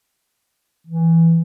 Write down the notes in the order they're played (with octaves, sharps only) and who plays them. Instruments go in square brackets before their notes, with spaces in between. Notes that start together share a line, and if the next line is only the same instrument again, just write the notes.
[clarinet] E3